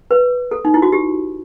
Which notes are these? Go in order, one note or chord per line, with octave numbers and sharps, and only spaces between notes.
B4
A4
D#4
E4
F#4
G4